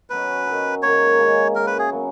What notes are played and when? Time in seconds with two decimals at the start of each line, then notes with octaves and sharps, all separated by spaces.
0.10 B2 F#3 C#4 B4
0.46 D#3 F#3 C#4
0.83 G#2 D#3 F#3 A#3 C#5
1.19 C#3 G#3 D#4
1.54 F#2 C#3 F#3 C#4 A#4
1.67 B4
1.79 G#4
1.91 C#3 F#3 B3